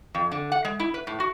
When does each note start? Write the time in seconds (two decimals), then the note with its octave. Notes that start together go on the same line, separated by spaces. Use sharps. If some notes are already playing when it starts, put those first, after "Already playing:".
0.15 F2
0.32 D3
0.52 F#5
0.65 G#3
0.80 E4
0.94 B4
1.07 A2
1.20 F#4